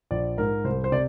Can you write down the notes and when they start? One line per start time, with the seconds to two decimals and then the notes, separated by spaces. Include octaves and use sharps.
0.11 A#1 D5
0.37 G#2 A#4
0.64 C2 C5
0.84 C5
0.92 C3 D5